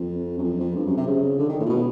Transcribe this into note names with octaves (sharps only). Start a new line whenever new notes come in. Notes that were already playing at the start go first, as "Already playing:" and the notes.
Already playing: F2
F#2
F2
F2
G2
F#2
C3
C#3
D3
D#3
A2
A#2
B2